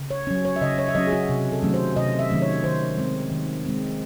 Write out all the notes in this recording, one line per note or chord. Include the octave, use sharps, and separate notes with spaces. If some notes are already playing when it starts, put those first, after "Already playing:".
Already playing: C#3
C#5
F#3 C#4
C#5
E5
C#3 D#5
C#5
E5
F#3 C#4 D#5
G#4
F#4
C3
A4
D#3 F#3 A3 C#4
C5
C3 D#5
E5
D#3 F#3 A3 C#4
C#5
D#3 C5
G#3 C4
D#3
G#3 C4